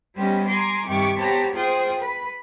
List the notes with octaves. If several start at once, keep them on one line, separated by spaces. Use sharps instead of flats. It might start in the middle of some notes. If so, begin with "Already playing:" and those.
G3 B3 C#4 G4 C5 D#5
G#5 A#5 C6 D6
G2 C3 D#3 G4 C#6 D6
B3 G4 C5 C#5 A5 A#5
F4 G#4 C5 G5 D#6
B4